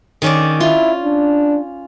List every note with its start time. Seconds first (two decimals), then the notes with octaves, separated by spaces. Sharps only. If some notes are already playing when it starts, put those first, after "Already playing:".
0.22 D#3 C#4 D5
0.60 E4 F4
1.04 D4